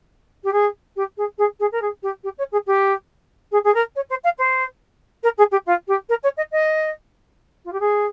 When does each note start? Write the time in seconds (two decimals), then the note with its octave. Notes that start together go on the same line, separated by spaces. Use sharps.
0.44 G4
0.52 G#4
0.96 G4
1.17 G#4
1.38 G#4
1.59 G#4
1.72 A#4
1.81 G#4
2.02 G4
2.23 G4
2.38 C#5
2.52 G#4
2.67 G4
3.51 G#4
3.64 G#4
3.74 A#4
3.95 C#5
4.09 C5
4.24 F5
4.38 C5
5.23 A#4
5.38 G#4
5.51 G4
5.66 F4
5.87 G4
6.09 A#4
6.23 C#5
6.37 D#5
6.51 D#5
7.64 F4
7.72 G4
7.80 G#4